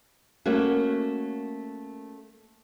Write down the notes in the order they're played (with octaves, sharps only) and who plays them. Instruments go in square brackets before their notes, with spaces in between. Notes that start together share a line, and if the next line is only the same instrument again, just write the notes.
[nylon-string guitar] A3 A#3 C#4 F#4